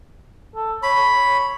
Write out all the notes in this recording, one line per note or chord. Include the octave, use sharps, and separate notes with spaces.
A4
C#5 B5